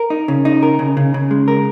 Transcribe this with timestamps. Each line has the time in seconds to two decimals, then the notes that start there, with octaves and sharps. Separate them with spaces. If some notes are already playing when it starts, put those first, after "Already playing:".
Already playing: A#4
0.10 D#4
0.28 C#3
0.45 D#4
0.63 A#4
0.79 C#3
0.97 C#3
1.14 C#3
1.31 G#3
1.48 A#4